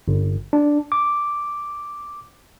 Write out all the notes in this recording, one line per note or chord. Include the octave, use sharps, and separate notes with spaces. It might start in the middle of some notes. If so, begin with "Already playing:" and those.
G1
D4
D6